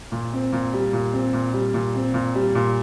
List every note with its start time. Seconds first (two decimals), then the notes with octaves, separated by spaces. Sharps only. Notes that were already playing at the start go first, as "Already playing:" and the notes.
0.12 A#2
0.33 C4
0.53 A#2
0.73 G3
0.93 A#2
1.13 C4
1.33 A#2
1.53 G3
1.74 A#2
1.95 C4
2.14 A#2
2.35 G3
2.55 A#2